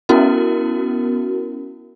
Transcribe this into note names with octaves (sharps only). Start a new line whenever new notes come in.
B3 C#4 E4 F#4 A#4